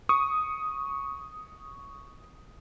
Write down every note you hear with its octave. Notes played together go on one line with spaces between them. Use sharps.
C#6 D#6